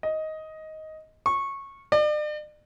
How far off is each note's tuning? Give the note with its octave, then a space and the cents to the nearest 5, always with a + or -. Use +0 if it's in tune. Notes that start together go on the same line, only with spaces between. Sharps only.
D#5 +10
C#6 -15
D5 +40